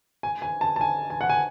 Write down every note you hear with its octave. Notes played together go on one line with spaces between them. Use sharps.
G#5
G#5
A5
A5
G#5
G#5
F#5
G#5